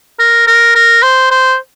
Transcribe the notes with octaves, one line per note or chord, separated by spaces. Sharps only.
A#4
A#4
A#4
C5
C5